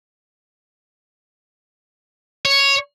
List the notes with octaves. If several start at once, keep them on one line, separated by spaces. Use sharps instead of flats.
C#5